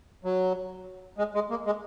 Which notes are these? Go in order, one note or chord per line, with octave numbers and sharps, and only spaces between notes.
F#3
G#3
G#3
A#3
G#3